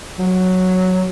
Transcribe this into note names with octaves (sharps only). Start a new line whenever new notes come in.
F#3